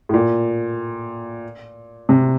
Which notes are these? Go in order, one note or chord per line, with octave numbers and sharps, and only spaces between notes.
A2
A#2
C3